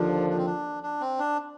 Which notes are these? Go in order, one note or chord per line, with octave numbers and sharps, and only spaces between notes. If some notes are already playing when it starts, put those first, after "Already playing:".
Already playing: D#2 D3 F3 D4
D4
C4
D4
D4
C4
D4